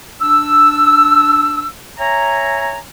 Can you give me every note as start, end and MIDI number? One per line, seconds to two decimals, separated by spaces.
0.21 1.67 62
0.21 1.67 88
1.98 2.78 73
1.98 2.78 76
1.98 2.78 80
1.98 2.78 82